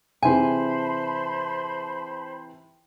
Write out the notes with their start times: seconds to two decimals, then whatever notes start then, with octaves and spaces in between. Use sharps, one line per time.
0.22 C3 E3 G#4 C5 G#5 A5 B5